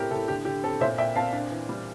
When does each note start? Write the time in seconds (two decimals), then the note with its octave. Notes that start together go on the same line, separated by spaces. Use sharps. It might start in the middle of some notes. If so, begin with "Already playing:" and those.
Already playing: A2 C4 G4 A#4
0.11 A2 A4
0.28 D3 G4
0.45 D3 G4
0.64 C4 A4
0.80 A#2 C5 E5
0.98 A#2 E5 G5
1.16 C4 F5 A5
1.33 D4
1.50 E3
1.69 G3